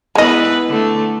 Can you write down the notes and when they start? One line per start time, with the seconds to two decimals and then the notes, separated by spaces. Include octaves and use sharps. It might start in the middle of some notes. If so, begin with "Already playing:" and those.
0.15 E3 G#3 B3 B4 D#5
0.68 D3 A3